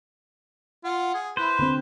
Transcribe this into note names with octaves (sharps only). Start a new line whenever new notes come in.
F4 F#5
G#4
E4 B4 C5
D3 C4